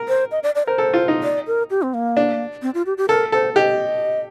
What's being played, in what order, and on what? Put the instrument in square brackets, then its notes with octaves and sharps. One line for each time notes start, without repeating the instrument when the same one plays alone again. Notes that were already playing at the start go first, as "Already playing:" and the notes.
Already playing: [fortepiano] A#4
[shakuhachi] C5
D#5
D5
D5
[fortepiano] A#4 [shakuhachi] C5
[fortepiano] A4
F4
D#4
[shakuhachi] D5
A#4
G4
C4
A#3
[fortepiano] D4
[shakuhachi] C4
F4
G4
G4
[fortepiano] A4 [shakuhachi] A#4
[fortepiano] A4 [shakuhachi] C5
[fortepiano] G4 [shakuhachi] D#5